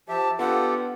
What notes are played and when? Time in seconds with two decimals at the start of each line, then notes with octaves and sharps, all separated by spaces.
0.09 F3 G4 E5 A5
0.39 B3 D4 F4 G4 A4 F#5